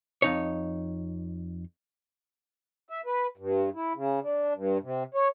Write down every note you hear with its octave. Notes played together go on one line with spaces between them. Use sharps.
F2 D#4 C#5
E5
B4
G2
E4
C#3
D4
G2
C3
C#5